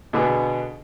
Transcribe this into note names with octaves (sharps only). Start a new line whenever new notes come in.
B2 D3 B3 G#4